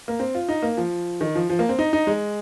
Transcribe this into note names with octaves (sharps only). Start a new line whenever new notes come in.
A#3
C4
F4
D#4
A#3
F3
D#3
F3
F3
A#3
C4
D#4
D#4
G#3